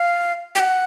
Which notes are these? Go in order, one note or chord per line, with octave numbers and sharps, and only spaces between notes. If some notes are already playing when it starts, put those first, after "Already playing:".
Already playing: F5
G5
F#5